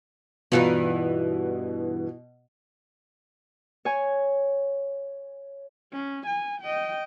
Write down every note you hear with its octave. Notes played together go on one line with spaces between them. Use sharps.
G2 B2 E3 B3 D#4 F4
C#5 G#5
C#4
G#5
D#5 G5